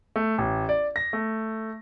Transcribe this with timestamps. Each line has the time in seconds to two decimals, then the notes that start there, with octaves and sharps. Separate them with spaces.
0.16 A3
0.38 A1
0.69 D5
0.96 A#6
1.13 A3